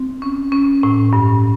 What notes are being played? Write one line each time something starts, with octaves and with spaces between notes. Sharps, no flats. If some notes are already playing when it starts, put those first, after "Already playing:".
Already playing: C4
C#4
C#4
A2
G2